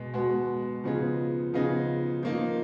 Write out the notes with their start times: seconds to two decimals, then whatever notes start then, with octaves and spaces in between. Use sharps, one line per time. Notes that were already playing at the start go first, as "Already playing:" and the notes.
Already playing: B2 G#3 B3
0.14 B2 G#3 B3 F#4
0.84 C#3 F3 B3 D#4 G#4
1.54 C#3 F3 B3 D#4 G#4
2.23 F3 A#3 D#4